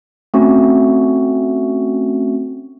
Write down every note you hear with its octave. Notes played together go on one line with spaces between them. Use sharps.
A3 C4 C#4 F#4